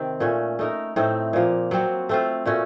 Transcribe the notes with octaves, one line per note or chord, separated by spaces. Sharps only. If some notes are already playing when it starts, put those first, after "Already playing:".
Already playing: C3 D#3 C4
A#2 A3 C#4
A3 D#4 A#4
A2 A3 C4 D#4
A#2 F3 A#3
F#3 C4 F#4
A3 C4 F4
A#2 A3 C#4 F#4